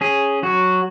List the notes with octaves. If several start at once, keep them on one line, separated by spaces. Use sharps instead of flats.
C#4 G#4
F#3 F#4